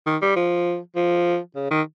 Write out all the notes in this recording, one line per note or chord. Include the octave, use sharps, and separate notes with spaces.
D#3
G3
F3
F3
C#3
D#3